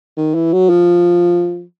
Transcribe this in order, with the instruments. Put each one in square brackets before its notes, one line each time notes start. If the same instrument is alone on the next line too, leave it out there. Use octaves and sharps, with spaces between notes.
[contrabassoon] D#3
E3
F#3
F3